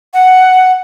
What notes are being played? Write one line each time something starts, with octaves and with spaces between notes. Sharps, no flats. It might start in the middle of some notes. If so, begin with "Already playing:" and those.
F#5